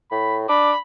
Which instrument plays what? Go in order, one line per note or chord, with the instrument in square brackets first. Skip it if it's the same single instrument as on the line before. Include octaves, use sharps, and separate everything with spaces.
[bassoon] A2 [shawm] B5
[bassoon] D4 [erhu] B5 [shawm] D6